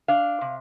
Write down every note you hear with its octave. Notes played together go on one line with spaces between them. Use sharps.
D4 F5
C3